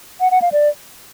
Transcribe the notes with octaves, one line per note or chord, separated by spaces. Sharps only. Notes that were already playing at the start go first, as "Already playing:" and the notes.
F#5
F#5
F5
D5